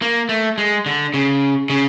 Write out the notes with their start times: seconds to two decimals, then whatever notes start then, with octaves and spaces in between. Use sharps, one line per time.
0.02 A#3
0.29 A3
0.58 G#3
0.86 D3
1.14 C#3
1.70 C#3